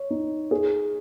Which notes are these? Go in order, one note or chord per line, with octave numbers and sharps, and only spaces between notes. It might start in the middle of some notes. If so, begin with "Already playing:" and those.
Already playing: C#5
D#4
G#4